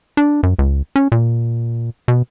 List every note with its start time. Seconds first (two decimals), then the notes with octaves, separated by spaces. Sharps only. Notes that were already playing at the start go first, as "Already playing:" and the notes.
0.17 D4
0.43 F#2
0.59 C#2
0.96 C#4
1.12 A#2
2.08 B2